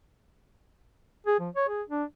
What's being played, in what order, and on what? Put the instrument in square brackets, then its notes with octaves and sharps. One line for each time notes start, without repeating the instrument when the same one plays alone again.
[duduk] G#4
F3
C#5
G#4
D4